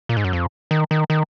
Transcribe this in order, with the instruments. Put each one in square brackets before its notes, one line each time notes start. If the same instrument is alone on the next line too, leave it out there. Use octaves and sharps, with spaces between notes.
[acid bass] A#2
G#2
F#2
F2
D#3
D#3
D#3